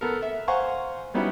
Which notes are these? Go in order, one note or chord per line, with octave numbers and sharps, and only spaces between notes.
B3 A4 A#4
E5
C5 F5 F#5 G#5 A#5 C#6
F#3 G3 B3 C#4 D#4 E4